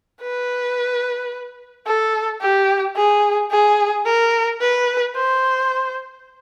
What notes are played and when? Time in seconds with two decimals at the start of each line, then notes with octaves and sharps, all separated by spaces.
0.21 B4
1.87 A4
2.41 G4
2.96 G#4
3.51 G#4
4.06 A#4
4.61 B4
5.16 C5